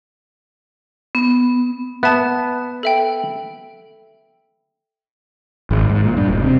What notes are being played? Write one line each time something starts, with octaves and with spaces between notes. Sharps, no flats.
B3
B3 E5 A5
A4 E5 G5
G#1
G#2
A#2
G2
E1
C3